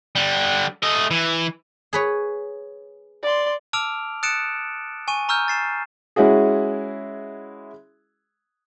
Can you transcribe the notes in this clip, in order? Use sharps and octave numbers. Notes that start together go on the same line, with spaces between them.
D3 G3
A3 D#5
E3
G#4 B4 C#5
D5 C6
A5 D6 E6 F6 D7 F7
D#6 F#6 A6 C#7 D7 E7
G#5 C#6 D#7
A#5 C#6 E6 F6 G6
A6 C7 E7
G#3 C#4 E4 F#4 G#4